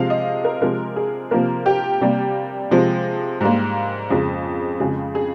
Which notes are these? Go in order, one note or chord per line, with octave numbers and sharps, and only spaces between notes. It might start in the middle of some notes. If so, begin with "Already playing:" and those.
Already playing: C3 F3 G#3 F5
D#5
A#4
C3 F3 G#3 A#4
G#4
C3 F3 A#3 A#4
G4
C3 G3 A#3 G4
C3 F3 G#3
G#2 G3 A#3
F2 C#3 G#3
F2 C#3 G#3 G#4
G#4